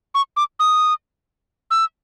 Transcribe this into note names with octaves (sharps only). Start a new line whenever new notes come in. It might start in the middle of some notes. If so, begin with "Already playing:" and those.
C#6
D6
D#6
E6